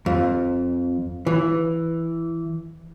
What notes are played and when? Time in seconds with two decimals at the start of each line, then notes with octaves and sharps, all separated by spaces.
0.06 F2
1.27 E3